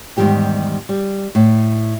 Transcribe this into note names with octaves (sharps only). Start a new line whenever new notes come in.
E2 G#2 D#3 G3 G4 G5
G3
A2